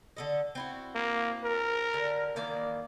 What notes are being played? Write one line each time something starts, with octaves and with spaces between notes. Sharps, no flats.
D3 A4 D#5
C4 E4 F#4
A#3
A#4
D3
D#3 E3 A#3 D5